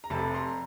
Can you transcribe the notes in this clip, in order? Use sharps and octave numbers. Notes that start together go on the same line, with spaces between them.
A#5
F1 F2 C3 A5 B5
A#5 C6